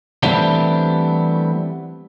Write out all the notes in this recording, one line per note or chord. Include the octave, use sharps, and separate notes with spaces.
E3 G3 A3 B3 C4 D4